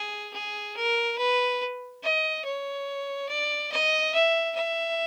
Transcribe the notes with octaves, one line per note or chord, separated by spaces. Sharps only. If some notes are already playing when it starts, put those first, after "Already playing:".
Already playing: G#4
G#4
A#4
B4
D#5
C#5
D5
D#5
E5
E5